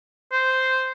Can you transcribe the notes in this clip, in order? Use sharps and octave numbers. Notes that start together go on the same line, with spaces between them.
C5